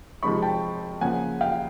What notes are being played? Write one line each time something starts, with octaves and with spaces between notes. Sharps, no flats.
C3 F3 G#3 C4 D#4 B5 C#6
G5 A5
C#3 F3 A#3 F#5 G#5
F5 G5